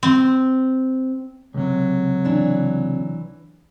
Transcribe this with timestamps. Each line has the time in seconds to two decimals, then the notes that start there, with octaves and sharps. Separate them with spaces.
0.03 C4
1.54 C#2 C3 F#3
2.25 E3 D4